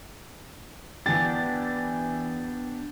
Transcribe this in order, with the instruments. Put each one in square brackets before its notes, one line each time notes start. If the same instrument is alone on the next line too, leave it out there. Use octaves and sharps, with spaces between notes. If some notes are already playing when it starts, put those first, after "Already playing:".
[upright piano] E3 A6 [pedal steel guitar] B3 D4 G4